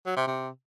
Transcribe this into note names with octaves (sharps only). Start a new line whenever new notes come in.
F#3
C3
C3